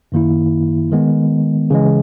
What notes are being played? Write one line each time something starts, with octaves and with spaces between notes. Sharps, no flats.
F#2 D#3 A#3 E4
D#3 G#3 B3
C#3 E3 G#3